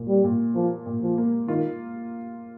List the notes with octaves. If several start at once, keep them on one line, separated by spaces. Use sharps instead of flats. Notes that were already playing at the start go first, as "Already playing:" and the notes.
Already playing: A#2 A#3
G3
A#2
F3 A#3
A#2
F3
A#3
D#3 F4